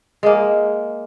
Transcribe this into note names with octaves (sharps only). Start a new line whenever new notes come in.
G#3 A#3